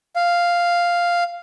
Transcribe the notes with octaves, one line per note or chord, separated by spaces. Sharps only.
F5